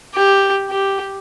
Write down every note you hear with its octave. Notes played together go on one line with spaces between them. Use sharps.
G4
G4